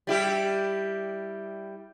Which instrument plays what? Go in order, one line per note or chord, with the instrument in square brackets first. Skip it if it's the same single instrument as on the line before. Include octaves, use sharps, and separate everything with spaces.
[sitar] G3 E4 G4